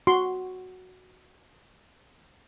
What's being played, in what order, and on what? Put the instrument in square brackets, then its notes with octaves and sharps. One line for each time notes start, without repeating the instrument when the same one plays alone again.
[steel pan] F#4 C6